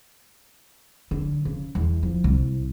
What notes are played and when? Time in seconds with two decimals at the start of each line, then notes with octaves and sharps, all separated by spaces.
1.11 D3
1.45 C#3
1.75 E2
2.03 F3
2.24 C2